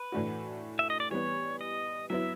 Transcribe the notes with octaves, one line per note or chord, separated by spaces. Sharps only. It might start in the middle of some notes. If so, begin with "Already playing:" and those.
Already playing: B4
A2 E3 A3 D4 F#4
E5
D#5
D5
E3 G3 B3 C#5
D#5
F#3 B3 E4 E5